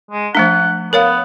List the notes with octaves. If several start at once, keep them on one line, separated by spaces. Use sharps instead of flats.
G#3
F3 A3 D4 F#5
B3 A#4 C#5 F5